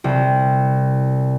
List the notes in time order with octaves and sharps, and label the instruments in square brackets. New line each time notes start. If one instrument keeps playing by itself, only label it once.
[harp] C2